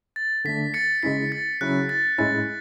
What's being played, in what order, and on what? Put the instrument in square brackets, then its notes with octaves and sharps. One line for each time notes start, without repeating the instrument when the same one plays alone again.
[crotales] A6
[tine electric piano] D3 A3 D4 [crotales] B6
[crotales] A6 C#7
[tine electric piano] C#3 G#3 C#4 E4 [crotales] B6
[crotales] A6
[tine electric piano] C#3 F#3 C#4 E4 [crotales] F#6
[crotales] A6
[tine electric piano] A2 G#3 C#4 E4 [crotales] A6